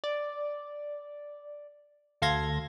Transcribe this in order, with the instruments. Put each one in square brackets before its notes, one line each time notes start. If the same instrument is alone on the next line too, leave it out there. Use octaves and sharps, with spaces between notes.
[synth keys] D5
D2 A4 F5 C6 G#6 A#6